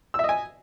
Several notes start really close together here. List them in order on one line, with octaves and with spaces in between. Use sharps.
E6 E5 D#5 G#5